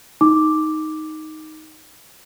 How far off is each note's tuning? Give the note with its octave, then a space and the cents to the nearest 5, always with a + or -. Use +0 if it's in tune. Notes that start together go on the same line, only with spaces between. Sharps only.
D#4 +5 D6 +0